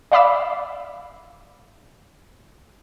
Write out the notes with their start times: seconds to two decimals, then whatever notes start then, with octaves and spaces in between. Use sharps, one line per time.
0.12 D5 E5 F5 B5 D6 E6